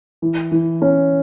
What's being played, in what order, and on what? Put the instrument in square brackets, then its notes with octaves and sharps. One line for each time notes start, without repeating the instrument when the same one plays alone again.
[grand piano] E3
E3
C#4